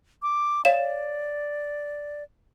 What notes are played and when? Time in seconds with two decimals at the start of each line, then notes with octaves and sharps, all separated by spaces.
0.22 D6
0.65 C#5 D5 F5 E7